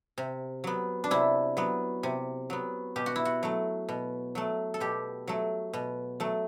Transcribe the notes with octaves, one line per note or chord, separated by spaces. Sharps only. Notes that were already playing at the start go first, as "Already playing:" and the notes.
C3
F#3 B3
D4
C3 E4
F#3 B3
C3
F#3 B3
B2 G4
F#4
E4
F#4
F#3 A3
B2
F#3 A3
A4
B2 G4
F#3 A3
B2
F#3 A3